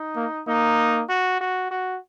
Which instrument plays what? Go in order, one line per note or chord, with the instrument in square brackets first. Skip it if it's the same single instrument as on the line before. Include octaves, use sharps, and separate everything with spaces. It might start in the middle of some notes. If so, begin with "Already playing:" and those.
Already playing: [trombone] D#4
[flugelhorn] A#3
[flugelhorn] A#3 [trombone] D#4
[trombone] F#4
F#4
F#4